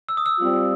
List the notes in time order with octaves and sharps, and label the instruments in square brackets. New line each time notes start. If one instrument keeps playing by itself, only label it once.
[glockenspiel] E6
D#6
E6
[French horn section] G3 C4 F4